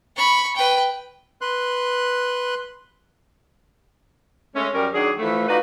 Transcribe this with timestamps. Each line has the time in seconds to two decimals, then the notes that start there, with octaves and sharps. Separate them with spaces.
0.16 B5 C#6
0.56 B4 G5
1.41 B4 C6 F#6
4.55 G#3 A3 C#4
4.74 F#2 G3 C#4 A#4
4.93 D#3 F#3 D4 G#4
5.19 E3 F3 A3
5.48 D#4 F4 F#4 B4 D5